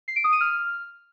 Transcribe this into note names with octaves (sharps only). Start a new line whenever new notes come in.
C7
D7
D#6
D#7
F6